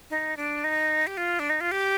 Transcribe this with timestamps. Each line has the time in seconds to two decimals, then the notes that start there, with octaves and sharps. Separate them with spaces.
0.10 D#4
0.37 D4
0.64 D#4
1.07 G4
1.17 F4
1.39 D4
1.50 D#4
1.61 F4
1.71 G4